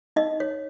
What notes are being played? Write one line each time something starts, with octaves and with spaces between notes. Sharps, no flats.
D#4 D#5
C#5